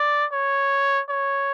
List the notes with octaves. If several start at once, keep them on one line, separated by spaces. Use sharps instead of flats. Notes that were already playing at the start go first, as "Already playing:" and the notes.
Already playing: D5
C#5
C#5